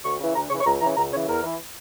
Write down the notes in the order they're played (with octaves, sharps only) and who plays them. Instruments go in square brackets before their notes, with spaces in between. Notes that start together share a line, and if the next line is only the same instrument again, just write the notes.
[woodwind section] D2 C#6
C#3 E3
D2 A#5
C#3 C#6
E3
C#6
C#2 A#5
C#3 E3 A#5
C#2 A#5
C#3 C#5
E3
E2 A#4
E3